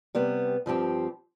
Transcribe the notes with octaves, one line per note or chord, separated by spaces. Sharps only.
C3 G3 B3
G2 F3 C4 G4